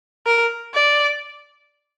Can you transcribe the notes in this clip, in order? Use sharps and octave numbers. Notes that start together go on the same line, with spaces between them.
A#4
D5